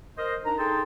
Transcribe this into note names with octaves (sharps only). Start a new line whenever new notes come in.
A#4 C5 D#5
D4 D#4 A#4 A#5
D#4 G#4 A4 G5 A5 C6